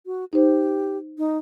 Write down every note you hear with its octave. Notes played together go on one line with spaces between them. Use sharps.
F#4
D#4 G4 C5
D#4